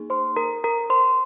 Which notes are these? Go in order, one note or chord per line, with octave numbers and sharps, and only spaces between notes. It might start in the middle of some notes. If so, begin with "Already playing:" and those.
Already playing: A#3 D#4 G#4
C5 C6
A#4 A#5
A#4 A#5
C5 C6